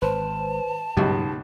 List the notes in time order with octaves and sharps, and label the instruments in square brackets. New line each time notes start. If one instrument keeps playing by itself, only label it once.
[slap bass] G#1 [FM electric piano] B4 C5 [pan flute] A5
[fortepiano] C#2 B2 [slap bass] G2 F#3 A#3 [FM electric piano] D#4 G4